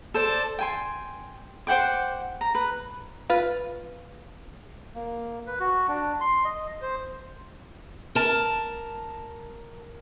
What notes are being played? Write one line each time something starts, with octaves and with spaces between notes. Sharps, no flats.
A4 C5 D5
G5 G#5 C6
C5 F#5 G5 D6
A#5
B4
F4 B4
A#3
B4
F#4
D4
C6
D#5
C5
A#4 A5